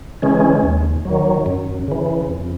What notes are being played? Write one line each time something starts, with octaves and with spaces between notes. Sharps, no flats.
C#3 E3 G#3 C#4
D#2
D#3 F#3
F#2
C#3 E3
F2